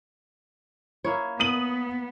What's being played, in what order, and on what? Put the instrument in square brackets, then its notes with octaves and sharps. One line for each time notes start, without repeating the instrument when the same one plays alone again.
[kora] A#3 E4 C#5
[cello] B3 [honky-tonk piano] D#6 D#7 F#7